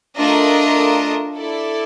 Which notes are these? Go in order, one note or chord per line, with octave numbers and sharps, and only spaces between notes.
A3 D4 F4 A#4 D#5
E4 A4 D5